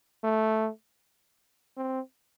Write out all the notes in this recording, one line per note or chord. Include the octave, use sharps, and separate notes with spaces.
A3
C4